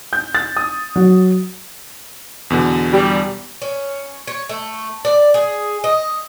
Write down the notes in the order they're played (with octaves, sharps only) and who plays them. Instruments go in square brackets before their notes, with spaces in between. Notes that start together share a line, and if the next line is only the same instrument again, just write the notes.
[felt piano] G6
A6
D#6
F#3
[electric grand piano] E2 B2 D3
[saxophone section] G3
[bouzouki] C#4
C#5
A3
D5
G#4
D#5